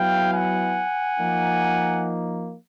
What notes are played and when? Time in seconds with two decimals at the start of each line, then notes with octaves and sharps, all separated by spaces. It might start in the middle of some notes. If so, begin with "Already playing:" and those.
Already playing: F#3 B3 E4 F5 G5
0.33 F#5 G#5
1.19 F3 A#3 D#4